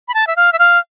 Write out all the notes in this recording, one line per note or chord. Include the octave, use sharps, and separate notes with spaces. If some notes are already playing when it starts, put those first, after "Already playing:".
B5
A5
E5
F5
E5
F5